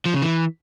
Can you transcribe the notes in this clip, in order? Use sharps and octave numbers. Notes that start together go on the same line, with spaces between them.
F3
C#3
E3